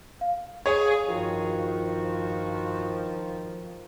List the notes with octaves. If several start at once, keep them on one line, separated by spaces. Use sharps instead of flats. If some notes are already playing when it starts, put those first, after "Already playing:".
F5
G#4 C#5
G2 D#3 F3 F#4